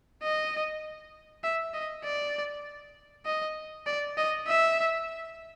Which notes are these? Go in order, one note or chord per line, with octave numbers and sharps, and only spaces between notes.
D#5
E5
D#5
D5
D#5
D5
D#5
E5